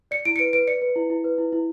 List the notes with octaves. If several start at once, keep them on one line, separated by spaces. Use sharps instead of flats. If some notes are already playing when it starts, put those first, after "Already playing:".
D5 C#7
E4 D7
C#7
B4 D7
B4 D7
D5 C#7
B4
E4
E4
B4
E4
E4